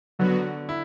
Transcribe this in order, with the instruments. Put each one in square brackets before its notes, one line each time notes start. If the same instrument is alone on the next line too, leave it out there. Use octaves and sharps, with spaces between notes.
[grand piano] D3 [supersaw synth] F#3 B3 F#4
[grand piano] E4